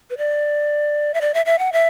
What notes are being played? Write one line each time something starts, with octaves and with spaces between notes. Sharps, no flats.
B4
D5
E5
D5
E5
E5
F#5
E5